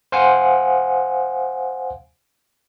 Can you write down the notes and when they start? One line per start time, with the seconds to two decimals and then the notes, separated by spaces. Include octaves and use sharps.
0.12 C5 F5 F#5 G#5